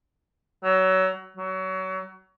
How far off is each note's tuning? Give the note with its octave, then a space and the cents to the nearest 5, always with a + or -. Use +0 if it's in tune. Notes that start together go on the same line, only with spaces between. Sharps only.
F#3 +25
F#3 +30